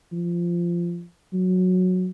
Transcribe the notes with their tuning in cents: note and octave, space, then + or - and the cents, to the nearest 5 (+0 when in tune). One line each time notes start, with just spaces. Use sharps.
F3 -15
F#3 -10